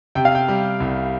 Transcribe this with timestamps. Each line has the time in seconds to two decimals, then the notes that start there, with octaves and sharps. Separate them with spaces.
0.15 C3 G5
0.25 F5
0.35 G5
0.48 G3
0.80 C2